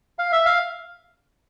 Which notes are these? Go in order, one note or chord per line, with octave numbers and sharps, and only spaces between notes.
F5
E5
F5